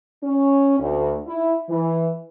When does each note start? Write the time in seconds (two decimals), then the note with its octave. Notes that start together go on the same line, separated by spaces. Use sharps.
0.24 C#4
0.79 D2
1.27 E4
1.70 E3